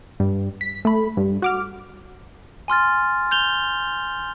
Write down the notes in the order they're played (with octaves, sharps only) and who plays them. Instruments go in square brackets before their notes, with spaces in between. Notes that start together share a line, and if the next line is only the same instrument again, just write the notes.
[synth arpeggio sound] G2
B6
A3 B5
G2
F#4 D6 F6
[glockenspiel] G#5 C6 F6 A6
G6 F7 G7